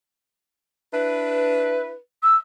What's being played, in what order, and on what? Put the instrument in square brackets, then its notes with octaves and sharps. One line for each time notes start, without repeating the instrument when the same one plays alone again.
[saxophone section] D4 E4 B4
[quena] E6